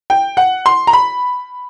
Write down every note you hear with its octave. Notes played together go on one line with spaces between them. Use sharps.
G5
F#5
C6
A#5
B5